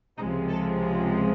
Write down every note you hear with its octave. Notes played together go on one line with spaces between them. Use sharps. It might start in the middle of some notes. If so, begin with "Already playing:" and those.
C#2 C3 F3 G#3 D#4
A4